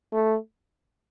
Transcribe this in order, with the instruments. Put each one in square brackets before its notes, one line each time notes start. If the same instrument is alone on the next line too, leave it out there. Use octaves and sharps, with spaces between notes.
[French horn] A3